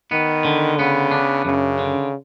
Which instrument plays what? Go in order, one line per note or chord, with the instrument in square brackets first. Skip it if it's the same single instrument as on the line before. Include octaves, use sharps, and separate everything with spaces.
[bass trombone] D#3 [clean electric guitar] B3
[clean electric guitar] D3
[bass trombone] C#3 [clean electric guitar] B3
[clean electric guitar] D4
[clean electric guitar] F#2 [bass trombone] C#3
[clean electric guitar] D3